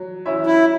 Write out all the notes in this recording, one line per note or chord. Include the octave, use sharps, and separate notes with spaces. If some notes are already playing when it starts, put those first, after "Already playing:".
Already playing: F#3
C#4 E4 C#5 E5
E4